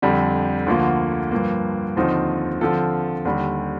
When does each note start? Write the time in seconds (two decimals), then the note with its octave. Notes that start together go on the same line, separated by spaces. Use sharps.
0.02 F2 D3 G3
0.67 D2 D3 F3 A#3 F4
1.31 G2 F3 A#3
1.97 D#2 D3 F3 C4 D#4
2.61 D3 F3 C4 F4 A4
3.25 D#2 D3 G3